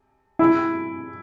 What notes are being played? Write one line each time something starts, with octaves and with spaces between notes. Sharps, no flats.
E4